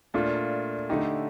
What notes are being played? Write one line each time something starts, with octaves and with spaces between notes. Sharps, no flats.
A#2 A3 D4 F4
D3 A3 D#4 G4